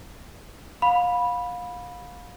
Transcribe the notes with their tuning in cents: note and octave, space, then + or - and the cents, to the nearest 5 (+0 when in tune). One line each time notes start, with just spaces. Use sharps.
F5 +30 B5 -10